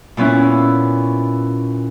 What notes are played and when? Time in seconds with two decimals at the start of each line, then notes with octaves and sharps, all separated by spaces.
0.17 A#2 B3 C#4 E4